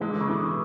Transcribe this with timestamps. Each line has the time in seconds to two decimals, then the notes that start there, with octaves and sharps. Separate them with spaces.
0.01 E3 G#3
0.11 D3
0.21 C#3
0.27 B2 D3 E3